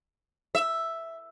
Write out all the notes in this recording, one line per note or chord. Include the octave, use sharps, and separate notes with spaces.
E5